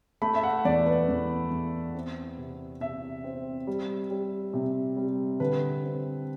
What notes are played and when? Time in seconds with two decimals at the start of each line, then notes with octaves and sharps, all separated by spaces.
0.22 A3 B5
0.35 E5
0.43 F#5
0.65 E2 D5
0.86 B4
1.08 E2
1.51 E2
1.95 C4
2.38 C3
2.81 C3 E5
3.24 C4
3.67 G3
4.11 G3
4.54 C3
4.97 G3
5.40 D3 B4
5.83 C4